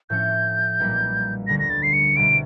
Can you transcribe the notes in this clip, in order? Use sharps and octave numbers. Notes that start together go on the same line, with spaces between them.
A2 F3 A3 C#4 G6
B1 A#2 G3 A#3
D2 D3 G3 B3 A#6
A#6
A6
C7
C#7
C2 B2 G3 D7